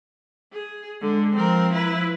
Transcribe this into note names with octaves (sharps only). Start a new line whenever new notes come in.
G#4
D3 G#3
F3 C4 A#4
E4 B4